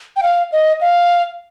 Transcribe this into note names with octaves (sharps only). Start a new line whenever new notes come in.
G5
F5
D#5
F5